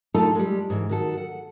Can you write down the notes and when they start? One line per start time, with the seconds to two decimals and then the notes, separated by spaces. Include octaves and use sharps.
0.14 A3 D#4 F4 A4 F5 A5
0.35 G3 G#3
0.70 G#2 E3
0.89 D#3 F#4 A4
1.17 F#5